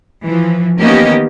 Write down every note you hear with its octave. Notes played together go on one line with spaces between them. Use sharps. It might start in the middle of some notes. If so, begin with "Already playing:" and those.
E3 F3
D#3 A#3 B3 C#4 G4 D#5